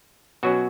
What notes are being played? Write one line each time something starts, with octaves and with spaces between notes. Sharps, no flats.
B2 F#3 C#4 F#4